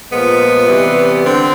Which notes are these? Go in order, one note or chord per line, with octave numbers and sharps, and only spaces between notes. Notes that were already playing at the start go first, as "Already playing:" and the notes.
A#2 F3 G#3 B3
C3 E3 G3
D3 C4